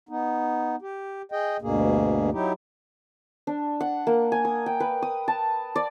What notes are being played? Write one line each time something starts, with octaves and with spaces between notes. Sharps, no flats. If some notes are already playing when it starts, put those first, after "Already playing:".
B3 D#4
G4
G#4 D#5 G5
D2 G2 B2 A#3 G#4
F#3 D#4 E4 G4
D4
F#5
A#3
G#5
D#6
G5
B4
D#6
A5
D5